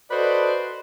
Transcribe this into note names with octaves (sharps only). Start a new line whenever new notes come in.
F#4 A4 B4 C5 D5 D#5